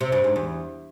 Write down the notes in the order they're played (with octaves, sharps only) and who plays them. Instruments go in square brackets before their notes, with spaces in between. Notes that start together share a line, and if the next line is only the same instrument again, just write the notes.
[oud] C3
G2
G#2
E2